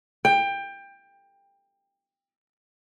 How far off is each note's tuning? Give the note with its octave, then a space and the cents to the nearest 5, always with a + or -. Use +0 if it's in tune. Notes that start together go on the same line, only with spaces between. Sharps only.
G5 +20